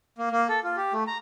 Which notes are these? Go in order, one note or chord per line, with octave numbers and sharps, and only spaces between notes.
A#3
A#3
A4
F4
G4
A3
A#5